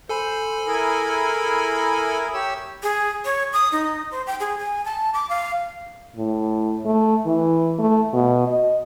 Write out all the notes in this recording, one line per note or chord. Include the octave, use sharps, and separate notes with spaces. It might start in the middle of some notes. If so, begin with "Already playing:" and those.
A4 C5 G#5 B5
E4 G#4 A#4
G4 C#5 E6
G#4
C#5
D#6
D#4
C5
G5
G#4
G#5
A5
D6
F5
A2
A3
E3
A3
B2
D#5